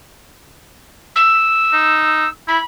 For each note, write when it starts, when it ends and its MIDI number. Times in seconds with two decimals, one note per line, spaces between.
1.16 2.29 88
1.73 2.26 63
2.48 2.59 64
2.48 2.65 83